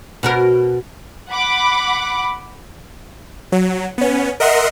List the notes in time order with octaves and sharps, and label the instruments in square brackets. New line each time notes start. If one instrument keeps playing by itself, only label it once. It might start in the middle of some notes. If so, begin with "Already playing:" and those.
[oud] B2 F#4 A#4
[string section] F#5 B5 D6
[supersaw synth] F#3
B3 C#4
A#4 D#5 E5 F#5 C6